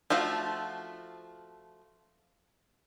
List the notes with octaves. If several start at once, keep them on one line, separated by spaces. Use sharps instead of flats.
F3 A3 F4 F#4